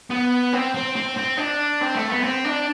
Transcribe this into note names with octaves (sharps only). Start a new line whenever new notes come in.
B3
C4
C4
C4
C4
D4
C4
A3
B3
C4
D4